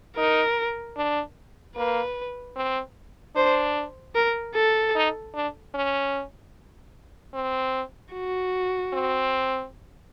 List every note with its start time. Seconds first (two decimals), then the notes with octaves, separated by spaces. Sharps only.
0.17 D#4 A#4
0.97 D4
1.76 A#3 B4
2.56 C4
3.36 D4 C5
4.15 A#4
4.55 A4
4.95 D#4
5.35 D4
5.74 C#4
7.34 C4
8.13 F#4
8.93 C4